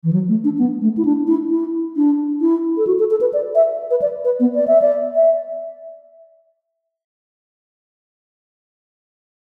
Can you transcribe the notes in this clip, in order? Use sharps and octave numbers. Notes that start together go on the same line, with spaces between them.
E3
F#3
A3
D4
B3
A3
E4
D4
E4
E4
D4
E4
A4
F#4
A4
A4
B4
D5
E5
B4
D5
B4
B3
D5
E5
D5
E5